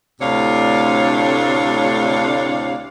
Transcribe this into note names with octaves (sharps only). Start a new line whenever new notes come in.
D2 A2 C3 D4 C#5 F5